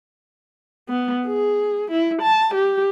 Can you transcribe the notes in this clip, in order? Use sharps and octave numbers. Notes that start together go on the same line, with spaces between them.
B3
G#4
E4
A5
G4